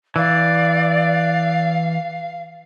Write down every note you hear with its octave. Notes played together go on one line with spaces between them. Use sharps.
E3 D5 F5